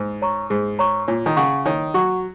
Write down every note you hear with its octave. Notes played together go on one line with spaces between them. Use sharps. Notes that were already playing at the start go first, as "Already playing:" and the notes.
Already playing: G#2
C#5 A#5 C#6
G#2 G#4
C#5 A#5 C#6
A#2 C#5
D#3
C#3 F#5 C#6
D#3 C#5
F#3 F#5 C#6